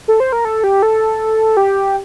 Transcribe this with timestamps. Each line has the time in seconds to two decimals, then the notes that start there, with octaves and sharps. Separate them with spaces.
0.08 A4
0.20 C5
0.32 A#4
0.45 A4
0.64 G4
0.82 A4
1.57 G4